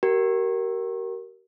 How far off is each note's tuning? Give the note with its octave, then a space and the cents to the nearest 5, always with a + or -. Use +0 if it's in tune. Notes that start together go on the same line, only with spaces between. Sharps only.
G4 -40 A#4 +0